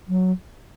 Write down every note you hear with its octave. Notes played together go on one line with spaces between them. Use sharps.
F#3